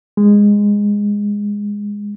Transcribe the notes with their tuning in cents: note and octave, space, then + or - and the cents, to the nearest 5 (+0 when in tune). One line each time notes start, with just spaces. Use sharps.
G#3 -15